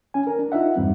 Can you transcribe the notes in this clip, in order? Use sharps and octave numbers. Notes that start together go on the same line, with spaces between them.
C#4 G#5
A#4
D4
D#4 F4 E5 F#5
E2 G2 G3 C4